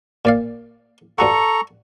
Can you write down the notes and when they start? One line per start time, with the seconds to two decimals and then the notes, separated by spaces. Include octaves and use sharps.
0.25 A#2 D5 F5
1.18 G2 F#4 A4 F#5 A#5 C#6